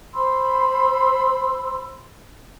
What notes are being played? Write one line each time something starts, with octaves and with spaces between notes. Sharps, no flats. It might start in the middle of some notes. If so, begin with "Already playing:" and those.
C5 B5 C6 E6